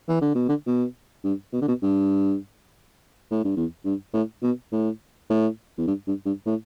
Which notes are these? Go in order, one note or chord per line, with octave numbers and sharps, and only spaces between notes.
E3
D3
B2
D3
B2
G2
B2
D3
B2
G2
A2
G2
E2
G2
A2
B2
A2
A2
E2
G2
G2
G2
A2